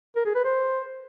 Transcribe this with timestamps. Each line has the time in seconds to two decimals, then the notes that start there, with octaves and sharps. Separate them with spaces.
0.16 A#4
0.26 G#4
0.35 B4
0.45 C5